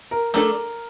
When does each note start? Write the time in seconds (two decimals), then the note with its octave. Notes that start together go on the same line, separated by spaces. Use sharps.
0.11 A#4
0.34 A3 D4 A4 A#4